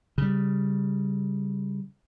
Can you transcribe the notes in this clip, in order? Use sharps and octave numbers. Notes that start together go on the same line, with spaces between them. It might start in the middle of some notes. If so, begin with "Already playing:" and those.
C#3 G3